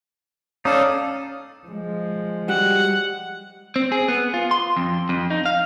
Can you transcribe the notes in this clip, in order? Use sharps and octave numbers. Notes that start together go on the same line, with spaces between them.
C#4 D#4 A4 D5 F5 D#6
F3 G#3
G3 F#4 G4 F#5
C4
G#4
B3
F4
C6
F2
F2
D#4
F5